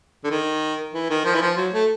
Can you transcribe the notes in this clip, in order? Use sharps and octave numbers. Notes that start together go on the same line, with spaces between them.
D3
D#3
E3
D#3
F3
E3
F3
F#3
A3